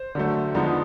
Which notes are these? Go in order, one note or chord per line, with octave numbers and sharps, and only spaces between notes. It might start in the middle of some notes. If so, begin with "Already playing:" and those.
Already playing: C5
D3 F#3 A3
D3 F3 G#3 B3 D#4